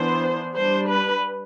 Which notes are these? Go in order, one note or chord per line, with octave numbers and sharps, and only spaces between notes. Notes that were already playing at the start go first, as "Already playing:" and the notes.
Already playing: E3 B3 D4 C5
G3 D4 C5
B4